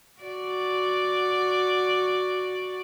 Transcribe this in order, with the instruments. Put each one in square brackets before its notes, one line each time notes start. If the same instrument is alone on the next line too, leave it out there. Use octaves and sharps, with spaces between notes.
[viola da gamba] F#4 D5